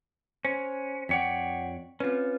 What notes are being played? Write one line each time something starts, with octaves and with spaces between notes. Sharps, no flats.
C#4 C5
F2 C#5 D5 F#5 G5 B6
C4 C#4 F4 B4